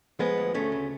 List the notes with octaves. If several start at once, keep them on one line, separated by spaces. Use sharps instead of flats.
F3 G#3 B3
D2
D2 A3 C#4
C#3